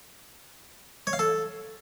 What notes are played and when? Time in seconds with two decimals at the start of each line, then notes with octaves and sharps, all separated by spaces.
1.07 C#5
1.13 F5
1.19 A4